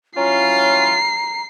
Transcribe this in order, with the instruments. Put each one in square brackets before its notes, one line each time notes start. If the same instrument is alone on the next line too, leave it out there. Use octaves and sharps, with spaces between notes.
[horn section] F#3 E4 F4 [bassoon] C#4 [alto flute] A#5 [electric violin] C7